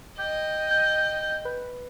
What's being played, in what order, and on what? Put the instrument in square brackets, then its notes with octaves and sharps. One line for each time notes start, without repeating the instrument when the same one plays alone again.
[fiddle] D#5 [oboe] G5
[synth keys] G6
B4